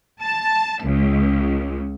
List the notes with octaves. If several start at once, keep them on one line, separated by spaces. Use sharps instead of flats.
A5
C#2